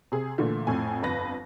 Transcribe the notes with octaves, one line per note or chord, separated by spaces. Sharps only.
C3 G#4
A#2 D3 E3 A3
F2 A2 G#5
G1 F2 B4 A#6